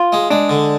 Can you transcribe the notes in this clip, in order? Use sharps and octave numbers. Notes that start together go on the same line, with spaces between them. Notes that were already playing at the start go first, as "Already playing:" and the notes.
Already playing: F4
G#3
G#3 D4
D3